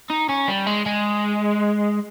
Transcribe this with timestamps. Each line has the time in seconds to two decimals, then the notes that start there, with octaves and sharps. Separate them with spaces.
0.10 D#4
0.29 C#4
0.48 G3
0.67 G#3
0.86 G#3